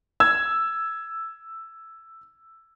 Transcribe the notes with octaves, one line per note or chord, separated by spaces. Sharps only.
E6 G#6